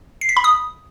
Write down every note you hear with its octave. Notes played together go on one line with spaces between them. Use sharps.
C7
B6
B5
D#6